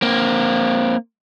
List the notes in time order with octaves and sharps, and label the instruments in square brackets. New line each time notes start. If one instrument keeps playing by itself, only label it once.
[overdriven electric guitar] A#3 C4